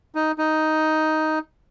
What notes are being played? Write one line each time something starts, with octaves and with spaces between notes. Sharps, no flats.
D#4
D#4